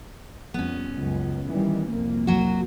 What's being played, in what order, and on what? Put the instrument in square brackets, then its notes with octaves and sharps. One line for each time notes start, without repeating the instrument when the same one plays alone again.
[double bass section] F2 G3 [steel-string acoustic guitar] B3 C#4
[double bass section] C#2 F#2
D#3 E3 G3
C2 F2 A#3
[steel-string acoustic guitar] F#3 F#4